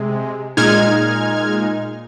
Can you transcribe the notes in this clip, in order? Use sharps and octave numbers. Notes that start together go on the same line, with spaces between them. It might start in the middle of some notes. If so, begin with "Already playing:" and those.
Already playing: C3 G#3
A#2 G#3 D#4 F6 G#6